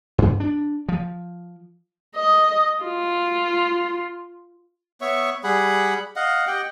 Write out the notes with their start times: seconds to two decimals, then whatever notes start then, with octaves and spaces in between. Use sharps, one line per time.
0.18 G2
0.40 D4
0.89 F3
2.16 D#5
2.84 F4
5.01 B3 C#5 E5 C#6
5.44 G3 G#4 F#5 B5
6.16 D#5 F5 F#5
6.47 G4 D#5 F#5 G5